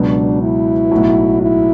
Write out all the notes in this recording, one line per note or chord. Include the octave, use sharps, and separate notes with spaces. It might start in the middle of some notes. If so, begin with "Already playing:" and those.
Already playing: C#2 B2 F#3 D4
E4
B1 A2 F#3
E4